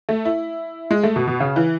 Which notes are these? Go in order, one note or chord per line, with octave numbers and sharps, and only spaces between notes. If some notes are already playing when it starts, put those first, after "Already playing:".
A3
E4
G#3
A3
B2
B2
C#3
E3